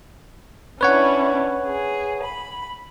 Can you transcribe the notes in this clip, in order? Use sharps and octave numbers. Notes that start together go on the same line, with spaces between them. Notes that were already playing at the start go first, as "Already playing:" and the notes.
C#4 D4 E4 B4 C#5 F#5
G#4
B5